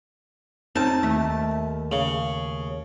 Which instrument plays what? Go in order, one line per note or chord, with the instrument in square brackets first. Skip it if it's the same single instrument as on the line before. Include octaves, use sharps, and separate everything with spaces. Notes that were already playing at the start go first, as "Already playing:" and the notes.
[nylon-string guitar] C4 C#4 [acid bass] D#4 [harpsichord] A5
[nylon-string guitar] D#2 [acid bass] A3
[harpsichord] C#3